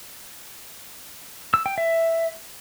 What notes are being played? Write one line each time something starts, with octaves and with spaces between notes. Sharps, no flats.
E6
G5
E5